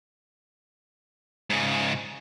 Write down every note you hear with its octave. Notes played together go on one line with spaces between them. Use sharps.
G#2 C#3